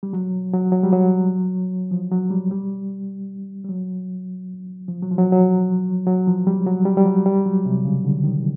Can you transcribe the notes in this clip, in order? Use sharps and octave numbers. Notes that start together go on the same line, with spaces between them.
G3
F#3
F#3
F#3
G3
F#3
F3
F#3
G3
G3
G3
F#3
F3
F#3
F3
F#3
F#3
F#3
F3
G3
F#3
G3
G3
F#3
G3
F#3
C3
C#3
D3
D#3